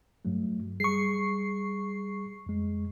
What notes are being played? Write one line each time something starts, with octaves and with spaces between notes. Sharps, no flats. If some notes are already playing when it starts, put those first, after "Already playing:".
G2 F#3 A3
G3 G#4 C#6 C7
F2 G#3